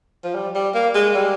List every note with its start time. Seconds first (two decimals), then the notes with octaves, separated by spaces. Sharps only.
0.24 F3
0.35 G3
0.55 G3
0.75 A#3
0.95 G#3
1.14 G3